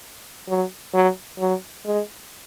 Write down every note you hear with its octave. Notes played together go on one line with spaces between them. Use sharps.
F#3
F#3
F#3
G#3